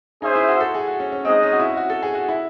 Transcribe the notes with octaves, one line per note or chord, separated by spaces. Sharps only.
C#4 D#4 G#4 C5 E5
E4
F#4
A4
G#4
F#4
C#4
C#4
G#3 C4 D#4 G#4 D#5
C#4
F#4
E4
F#4
A4
G#4
F#4
E4